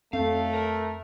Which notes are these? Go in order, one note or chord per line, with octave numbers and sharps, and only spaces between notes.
F2 D#3 F#3 A3 C4 A4 F5
A#4